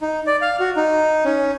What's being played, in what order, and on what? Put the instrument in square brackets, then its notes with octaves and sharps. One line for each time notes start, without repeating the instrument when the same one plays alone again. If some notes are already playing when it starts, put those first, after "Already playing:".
[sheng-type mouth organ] D#4
D5
F5
F#4
D#4
C#4